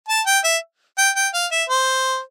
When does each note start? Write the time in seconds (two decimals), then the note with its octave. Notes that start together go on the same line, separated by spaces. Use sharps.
0.08 A5
0.26 G5
0.44 E5
0.98 G5
1.16 G5
1.34 F5
1.51 E5
1.69 C5